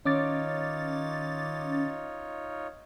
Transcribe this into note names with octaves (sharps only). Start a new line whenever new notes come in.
D#3 C#4 D#4 F4 C#5 D6 A6